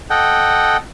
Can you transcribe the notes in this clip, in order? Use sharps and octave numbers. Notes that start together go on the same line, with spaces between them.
A4 D#5 F#5 G5